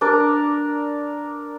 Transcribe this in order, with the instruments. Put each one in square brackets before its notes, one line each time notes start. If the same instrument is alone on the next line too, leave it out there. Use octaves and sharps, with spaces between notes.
[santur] D4 A#4 D5